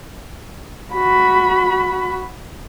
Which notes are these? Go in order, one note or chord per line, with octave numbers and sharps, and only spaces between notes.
F#4 B5